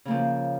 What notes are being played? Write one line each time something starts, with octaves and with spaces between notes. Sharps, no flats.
C#3 F3 A#3